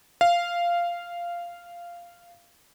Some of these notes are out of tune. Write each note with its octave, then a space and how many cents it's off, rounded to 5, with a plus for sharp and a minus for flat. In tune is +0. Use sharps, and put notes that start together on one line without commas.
F5 -10